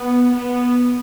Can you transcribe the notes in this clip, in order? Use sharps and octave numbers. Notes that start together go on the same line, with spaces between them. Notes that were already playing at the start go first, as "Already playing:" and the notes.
Already playing: B3
B3